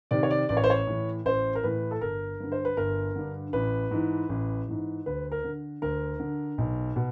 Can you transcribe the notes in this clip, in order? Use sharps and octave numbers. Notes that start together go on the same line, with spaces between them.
C3 D#3 D5
C#5
D5
A1 D5
C#5
C5
C#5
A2 E3
A1 C5
A#4
A2 E3 B4
A4
G1 A#4
G2 D3
C5
B4
G1 A#4
G2 D3
A1 B4
G#2 E3
A1
G#2 E3
D2 B4
A#4
D3
D2 A#4
D3
B1
B2